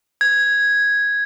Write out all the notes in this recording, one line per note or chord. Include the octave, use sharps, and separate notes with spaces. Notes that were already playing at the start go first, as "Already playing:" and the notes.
G#6